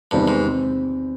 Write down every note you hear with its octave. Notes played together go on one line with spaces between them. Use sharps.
E2 G2 C3 D#3 G3
G#2
C4